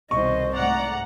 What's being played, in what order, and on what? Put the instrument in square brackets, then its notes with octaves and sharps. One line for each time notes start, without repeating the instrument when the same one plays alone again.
[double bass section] C2 B2 D#3 [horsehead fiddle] C5 D#5 [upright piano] C#6
[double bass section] G#2 A3 [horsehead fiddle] D5 [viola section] F#5 A#5